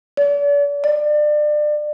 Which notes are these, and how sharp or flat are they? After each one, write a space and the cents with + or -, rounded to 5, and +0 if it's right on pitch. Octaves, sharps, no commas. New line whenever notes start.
D5 -40
D5 +30